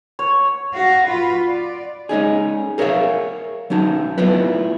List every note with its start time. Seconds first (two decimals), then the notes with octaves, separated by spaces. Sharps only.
0.19 C#5
0.74 F#4 F5
1.07 F4 B4
1.48 D5
2.09 G#3 C#4 D#4 G#4
2.78 G#4 A#4 C#5 D5 E5 F5
3.70 F#3 C#4 D#4 A5
4.18 A3 B3 E4 F4 B4